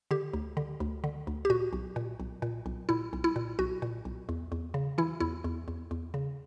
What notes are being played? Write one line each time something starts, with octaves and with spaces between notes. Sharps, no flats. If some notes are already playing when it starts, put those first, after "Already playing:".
D3 G4
D2
D3
D2
D3
D2
G4
A#2 F#4
B1
A#2
B1
A#2
B1
A#2 E4
B1
E4
A#2
B1 F#4
A#2
B1
E2
E2
C#3
E3 E4
E2 E4
E2
E2
E2
C#3